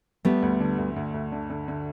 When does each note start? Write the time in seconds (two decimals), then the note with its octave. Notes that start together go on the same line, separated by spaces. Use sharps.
0.25 G3 A3 B3
0.42 D2
0.60 D3
0.78 D2
0.96 D2
1.14 D2
1.32 D3
1.50 D3
1.68 D3